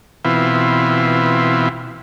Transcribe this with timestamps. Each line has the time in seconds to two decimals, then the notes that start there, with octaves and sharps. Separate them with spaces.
0.25 B2 E3 C4 E4 F4